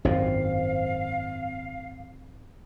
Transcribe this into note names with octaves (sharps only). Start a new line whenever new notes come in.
G#1 F#2 A#2 C4 F5